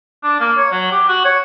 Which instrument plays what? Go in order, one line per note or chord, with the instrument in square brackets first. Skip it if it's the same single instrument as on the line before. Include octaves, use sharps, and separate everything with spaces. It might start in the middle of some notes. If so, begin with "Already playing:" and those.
[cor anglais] D4
A#3
C#5
F#3
G4
F#4
C#5